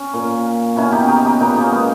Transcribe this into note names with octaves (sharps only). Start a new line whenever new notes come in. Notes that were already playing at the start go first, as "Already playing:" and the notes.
Already playing: C#4
A#2
B2 C#4 E4
D#4 G4
D#4 G4
D#4 G4
A#2 B3 D#4
A#3 C#4
G#3 B3